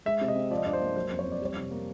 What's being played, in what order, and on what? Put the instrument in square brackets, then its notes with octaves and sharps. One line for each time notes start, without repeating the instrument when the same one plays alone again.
[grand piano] G#3 E5
C3
D#5
C4
F3 D5
D#5
G2 D5
C5
A#3
F#3 C5
F2
C#5
F2
D5
G3 C#5
C3
A#3